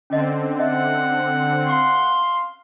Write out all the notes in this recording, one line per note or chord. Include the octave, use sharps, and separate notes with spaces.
D3 C4 C#4 D#5
D#5 E5 F#5
F5 C6